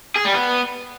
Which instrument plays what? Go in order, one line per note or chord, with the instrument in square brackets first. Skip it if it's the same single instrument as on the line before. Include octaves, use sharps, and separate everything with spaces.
[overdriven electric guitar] G#4
G3
B3